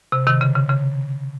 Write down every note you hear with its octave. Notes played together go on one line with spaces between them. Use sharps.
C3
C3 D#3
C#3
C#3
C#3